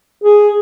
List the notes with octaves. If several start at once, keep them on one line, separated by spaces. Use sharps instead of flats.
G#4